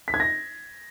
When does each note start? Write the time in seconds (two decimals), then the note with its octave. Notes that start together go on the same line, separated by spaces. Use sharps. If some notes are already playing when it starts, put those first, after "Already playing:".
0.08 B6
0.14 G#6
0.20 A#6